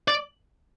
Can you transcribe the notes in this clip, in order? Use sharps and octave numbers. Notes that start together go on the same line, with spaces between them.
D5